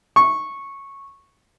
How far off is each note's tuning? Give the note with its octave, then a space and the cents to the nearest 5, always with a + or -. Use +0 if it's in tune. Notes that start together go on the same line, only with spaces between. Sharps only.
C#6 -10